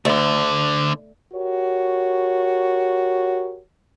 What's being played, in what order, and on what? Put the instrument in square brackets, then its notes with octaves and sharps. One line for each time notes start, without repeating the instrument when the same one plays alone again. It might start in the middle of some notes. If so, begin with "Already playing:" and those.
[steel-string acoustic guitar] D2 [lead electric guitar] D3 A3
[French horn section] F#4 G4 A#4 C#5